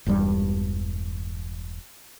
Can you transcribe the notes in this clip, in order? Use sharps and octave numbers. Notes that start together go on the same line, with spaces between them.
E1 E2 G2 G3